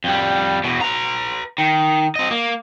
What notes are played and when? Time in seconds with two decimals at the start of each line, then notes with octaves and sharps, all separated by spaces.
0.04 F2 G3
0.64 E2 B2
0.81 B4 A#5
1.58 D#3
2.16 C4 D#5
2.31 A#3